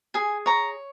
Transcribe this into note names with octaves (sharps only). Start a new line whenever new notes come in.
G#4 G#5
C#5 A#5